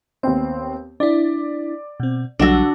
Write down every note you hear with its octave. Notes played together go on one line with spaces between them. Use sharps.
D#2 B3 C4 G5
D4 E4 D5
B2 C4
B1 D3 F#3 G3 D4 F#4 F#5 E6